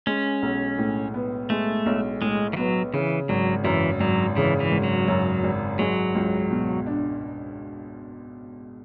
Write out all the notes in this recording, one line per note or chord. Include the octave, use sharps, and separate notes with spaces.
G#3 C#4
B1
A2
B3
G#3 A3
B1
A2 G#3
E3
F#3 B3
C#3 E3
G#1 F#3
F#2 E3
G#1 F#3
C#3 E3
E3
G#1
F#3
F#2
G#1
F#3 G#3
C#2
B2
D4